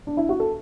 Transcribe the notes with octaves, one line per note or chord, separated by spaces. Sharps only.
D4
E4
F#4
A4